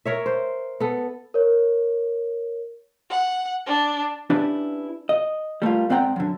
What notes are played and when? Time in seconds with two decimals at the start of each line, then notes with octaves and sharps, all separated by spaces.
0.06 A#4 C#5 E5
0.26 C5
0.80 B3 A4
1.34 A#4 C#5
3.10 F#5
3.66 D4
4.30 C#4 D4 E4 G4 B4 D5
5.09 D#5
5.62 G3 A3 A#3 F4
5.90 G#2 C4 D5 F#5 G5 A#5
6.16 F#2 D3